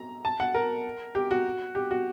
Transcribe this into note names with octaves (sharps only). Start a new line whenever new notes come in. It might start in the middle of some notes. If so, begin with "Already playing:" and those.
Already playing: A#5
A5
F#5
A#4
G4
F#4
G4
F#4